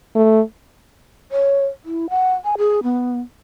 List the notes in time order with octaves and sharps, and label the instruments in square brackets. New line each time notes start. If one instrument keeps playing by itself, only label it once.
[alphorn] A3
[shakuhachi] C#5
E4
F#5
G#5
G#4
B3